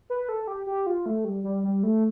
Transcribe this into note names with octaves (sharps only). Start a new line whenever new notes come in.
B4
A4
G4
G4
F4
A3
G3
G3
G3
A3